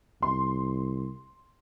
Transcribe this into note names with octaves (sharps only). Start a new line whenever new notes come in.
C2 C6